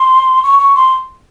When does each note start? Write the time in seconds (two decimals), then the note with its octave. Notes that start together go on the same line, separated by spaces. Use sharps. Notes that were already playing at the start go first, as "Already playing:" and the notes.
Already playing: C6
0.43 C#6
0.59 C#6
0.75 C6